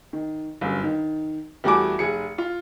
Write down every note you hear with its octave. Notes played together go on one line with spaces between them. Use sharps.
D#3
G1 F#2
D#3
E2 G3 A3 F#4 G#5 D6
F1 G#4 C#7
F4